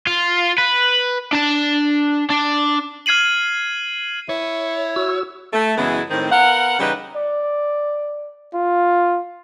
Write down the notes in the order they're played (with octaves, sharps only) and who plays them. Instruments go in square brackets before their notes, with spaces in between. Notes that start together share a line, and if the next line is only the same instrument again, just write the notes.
[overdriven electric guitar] F4
B4
D4 A5
D4
[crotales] F6 G#6 C7 D#7 F#7
[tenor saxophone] E4 [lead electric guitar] C#5
[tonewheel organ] F#4 E6
[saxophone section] A3
F#2 C#3 E3 G#3 B3 E4
A2 D#3 C4
B3 A#4 F5 F#5
C#3 E3 G3 D#4 G4 B4
[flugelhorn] D5
F4